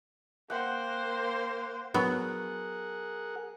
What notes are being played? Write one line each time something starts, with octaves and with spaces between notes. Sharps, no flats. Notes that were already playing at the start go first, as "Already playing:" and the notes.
A#3 C5 F#5 G5
F#3 B3 G#4 A#4 F#5